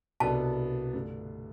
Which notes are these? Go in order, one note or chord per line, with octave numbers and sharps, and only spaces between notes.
C2 B2 B3 D4 A4 A5
G2 D3 A3